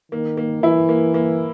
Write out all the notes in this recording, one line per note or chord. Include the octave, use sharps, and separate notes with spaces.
D#3 A#3
A#3
E3 E4
A#3
A#3